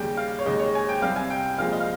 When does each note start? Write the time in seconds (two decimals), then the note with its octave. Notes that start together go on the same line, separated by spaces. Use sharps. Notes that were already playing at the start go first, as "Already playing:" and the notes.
Already playing: D#2 C#3 G3 G5
0.17 F5
0.39 C#5
0.46 D#2 C#3 G#3 D#5
0.59 C#5
0.75 G#5
0.89 G5
1.02 C2 C3 G3 F5
1.16 G#5
1.30 G5
1.58 C2 A#2 F3 G#3 F5
1.72 D#5
1.80 F5